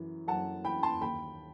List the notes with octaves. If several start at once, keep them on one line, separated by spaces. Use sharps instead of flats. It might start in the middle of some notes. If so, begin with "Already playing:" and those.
Already playing: F#2 E3
F#2 F#5 A5
E3 G5 B5
A5 C6
D#2 G5 B5